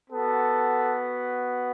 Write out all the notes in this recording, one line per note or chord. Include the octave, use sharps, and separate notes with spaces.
B3 F#4 A4